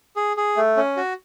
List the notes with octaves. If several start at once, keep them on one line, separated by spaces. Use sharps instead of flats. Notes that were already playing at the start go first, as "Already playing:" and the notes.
G#4
G#4
A3
C#4
F#4